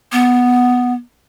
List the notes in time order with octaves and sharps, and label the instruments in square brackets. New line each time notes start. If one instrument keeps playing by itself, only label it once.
[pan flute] B3